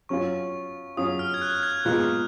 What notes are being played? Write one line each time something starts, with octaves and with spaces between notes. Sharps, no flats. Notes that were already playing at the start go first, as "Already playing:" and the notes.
F#3 C#4 F4 C#6
F#3 C#4 F4 D#6
F6
G#6
F#6
F#6
G#6
A#2 G#3 B3 F4 F#6